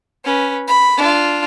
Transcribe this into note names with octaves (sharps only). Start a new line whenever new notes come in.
C#4 B4
B5
D4 F4